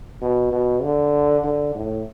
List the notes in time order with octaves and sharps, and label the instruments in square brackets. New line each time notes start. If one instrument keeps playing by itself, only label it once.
[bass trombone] B2
B2
D3
D3
A2